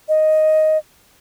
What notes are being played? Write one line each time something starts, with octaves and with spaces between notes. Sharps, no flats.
D#5